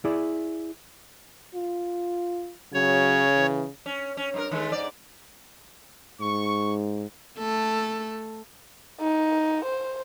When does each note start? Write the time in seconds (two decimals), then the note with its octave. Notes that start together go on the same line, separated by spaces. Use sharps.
0.05 E4 G#4 D5
1.55 F4
2.73 C#3 F#3 C#5
3.37 E3
3.86 C#4
4.17 C#4
4.34 G2 D#4 A#4
4.51 D#3 G#3 A3
4.72 G#2 D5
6.21 G#2 C#6
7.38 A3 A4
9.01 D#4
9.65 C5